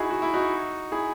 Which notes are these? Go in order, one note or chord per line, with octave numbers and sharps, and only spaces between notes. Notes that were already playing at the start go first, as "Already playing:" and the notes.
Already playing: D#4 E4 F#4 G#4
F#4
E4
D#4 F#4
E4 G#4